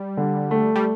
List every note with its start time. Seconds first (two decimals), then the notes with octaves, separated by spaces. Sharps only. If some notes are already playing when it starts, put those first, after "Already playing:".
Already playing: G3
0.17 D3
0.51 A3
0.76 G3